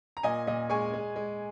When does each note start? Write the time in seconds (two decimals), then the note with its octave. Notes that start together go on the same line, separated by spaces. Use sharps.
0.17 A#5
0.23 A#2 D#5 G#5
0.47 A#2 D#5
0.69 G#3 G#5 C#6
0.94 G#3
1.16 G#3